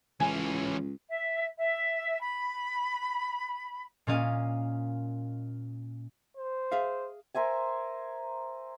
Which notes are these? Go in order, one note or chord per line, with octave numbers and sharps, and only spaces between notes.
C#2 E3 C#4 G#5
E5
E5
B5
A#2 A#3 C#4 D#5 F5
C5
G#4 E5 F5
A#4 C5 E5 G#5